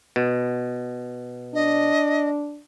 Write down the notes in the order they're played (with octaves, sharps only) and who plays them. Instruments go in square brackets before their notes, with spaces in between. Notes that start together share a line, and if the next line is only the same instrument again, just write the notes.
[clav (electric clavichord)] B2
[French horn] D4 [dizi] D#5